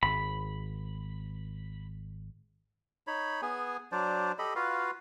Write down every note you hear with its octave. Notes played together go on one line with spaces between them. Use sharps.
G#1 B5
D#4 C#5 B5
B3 G#4 G#5
F#3 D4 C5 D5
G4 A4 D#5 B5
F4 F#4 B4 F5